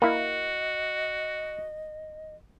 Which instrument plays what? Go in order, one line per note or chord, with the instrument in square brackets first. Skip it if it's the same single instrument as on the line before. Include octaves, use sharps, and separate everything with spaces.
[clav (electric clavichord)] A#3 E4 [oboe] F#4 [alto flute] D#5